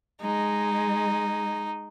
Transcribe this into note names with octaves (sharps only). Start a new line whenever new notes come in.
G#3 D#4